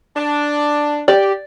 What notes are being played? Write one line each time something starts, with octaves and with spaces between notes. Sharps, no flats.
D4
G4 D5